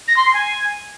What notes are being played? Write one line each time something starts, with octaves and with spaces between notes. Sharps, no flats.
A#6
C6
C7
G#5